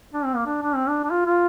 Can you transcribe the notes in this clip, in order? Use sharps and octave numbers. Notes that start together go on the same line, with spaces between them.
D4
C4
A#3
D4
D4
C4
D4
D4
F4
F4